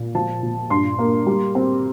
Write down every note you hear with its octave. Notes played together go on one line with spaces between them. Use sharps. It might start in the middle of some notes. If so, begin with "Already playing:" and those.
Already playing: A#2
F3 A5
A#2
G2 C6
A#3
G3
C4